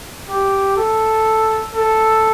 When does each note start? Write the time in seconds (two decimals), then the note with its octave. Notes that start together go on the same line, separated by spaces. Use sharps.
0.29 G4
0.77 A4
1.75 A4